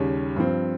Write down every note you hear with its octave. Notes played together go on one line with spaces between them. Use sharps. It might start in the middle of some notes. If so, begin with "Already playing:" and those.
Already playing: D#2 C#3 G3 C#4
G2 F3 C4